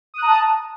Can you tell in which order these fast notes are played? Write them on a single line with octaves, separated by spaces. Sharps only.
D#6 F#6 A#5 A5